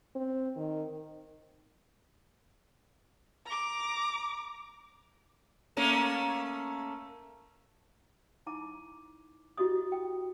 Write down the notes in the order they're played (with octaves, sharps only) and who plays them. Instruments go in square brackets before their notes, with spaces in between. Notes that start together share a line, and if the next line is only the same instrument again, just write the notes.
[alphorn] C4
D#3
[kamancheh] A#5 D6
[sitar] A3 A#3 C#4
[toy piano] D#4 E4 A#5 D6
E4 F#4 G4 D#5 D#6
G5